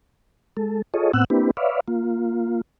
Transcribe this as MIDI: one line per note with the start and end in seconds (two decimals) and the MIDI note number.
0.57 0.82 56
0.57 0.82 69
0.94 1.12 65
0.94 1.12 68
0.94 1.12 69
0.94 1.12 73
0.94 1.12 75
1.13 1.25 45
1.13 1.25 59
1.13 1.25 60
1.13 1.25 78
1.13 1.25 88
1.13 1.25 90
1.30 1.51 58
1.30 1.51 60
1.30 1.51 62
1.30 1.51 64
1.30 1.51 67
1.30 1.51 71
1.57 1.80 71
1.57 1.80 73
1.57 1.80 74
1.57 1.80 76
1.57 1.80 77
1.88 2.61 58
1.88 2.61 65